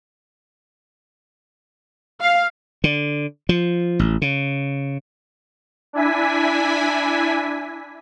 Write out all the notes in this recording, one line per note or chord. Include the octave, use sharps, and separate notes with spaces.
F5
D3
F3
A1
C#3
D4 E4 G#5 B6